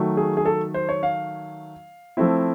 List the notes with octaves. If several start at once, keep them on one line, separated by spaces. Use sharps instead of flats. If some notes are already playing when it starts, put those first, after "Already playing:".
Already playing: D#3 F#3 A3
G#4
G#4
A4
C5
C#5
F5
F3 A3 C4 E4